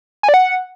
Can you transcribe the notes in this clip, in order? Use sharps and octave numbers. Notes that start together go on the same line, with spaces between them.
G#5
D5
F#5